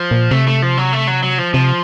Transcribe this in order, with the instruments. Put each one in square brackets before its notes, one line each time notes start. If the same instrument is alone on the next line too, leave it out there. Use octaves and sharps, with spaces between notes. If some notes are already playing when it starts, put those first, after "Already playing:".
Already playing: [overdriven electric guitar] F3
[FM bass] A#2
[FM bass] C3 [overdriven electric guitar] A3
[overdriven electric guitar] A3
F3
F#3
A3
F#3
F#3
F3
[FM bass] C3 [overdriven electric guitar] F3